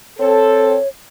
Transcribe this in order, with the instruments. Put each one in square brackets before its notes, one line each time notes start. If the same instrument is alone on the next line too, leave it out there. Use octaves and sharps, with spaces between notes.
[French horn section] C4 A4 [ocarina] C#5